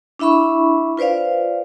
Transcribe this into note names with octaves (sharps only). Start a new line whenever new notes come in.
D4 E4 E5 B5 C#6
F4 B4 C5 D5 F5